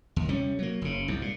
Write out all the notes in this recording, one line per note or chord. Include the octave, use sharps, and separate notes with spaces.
D#2
C3 G3 C#4
F#3 A#3
F#1 C#3
C2 G#2
A#2